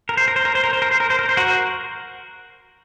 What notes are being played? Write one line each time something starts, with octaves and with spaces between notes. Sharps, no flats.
A#4
C5
A#4
C5
A#4
C5
A#4
C5
A#4
C5
A#4
C5
A#4
C5
F#4 A#4